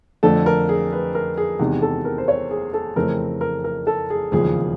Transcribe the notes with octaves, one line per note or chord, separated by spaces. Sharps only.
F2 D3 F3 A3 A4
A#4
G#4
B4
A#4
G#4
E2 C3 D#3 G#3
A4
A#4
C5
C#5
G#4
A4
F2 C#3 E3 A3 C4 A#4
A#4
A#4
A4
G#4
E1 D#2 C#3 F3 G#3 G#4